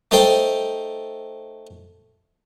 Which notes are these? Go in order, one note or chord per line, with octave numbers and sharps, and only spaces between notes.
A3 D#4 A4 C5 G5